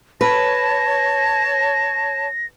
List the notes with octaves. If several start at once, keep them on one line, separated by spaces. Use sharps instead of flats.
B4 C#5 A5 A#6